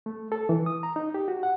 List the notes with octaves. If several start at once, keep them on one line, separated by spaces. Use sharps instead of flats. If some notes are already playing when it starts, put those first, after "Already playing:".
A3
A4
E3
D#6
A#5
D#4
G4
F#4
F#5